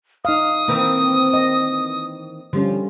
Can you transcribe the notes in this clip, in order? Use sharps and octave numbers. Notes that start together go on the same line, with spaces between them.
D#4 F5 D#6
D#3 E3 A#3 C4
D#5
D3 F3 G3 C#4